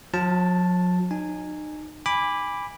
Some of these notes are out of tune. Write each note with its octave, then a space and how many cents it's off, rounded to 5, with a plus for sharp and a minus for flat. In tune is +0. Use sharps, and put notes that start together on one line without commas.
F#3 -45 A5 +0
D#4 -35 G#5 -5
G#5 -25 B5 +0 D6 +0